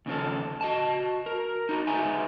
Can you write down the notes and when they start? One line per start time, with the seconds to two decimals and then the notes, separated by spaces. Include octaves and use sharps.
0.06 D#2 C#3 F3 A4
0.61 F#4 D#5 A5
1.26 A#4
1.69 D#4 F#4
1.87 D#4 G#4 B4 E5 G#5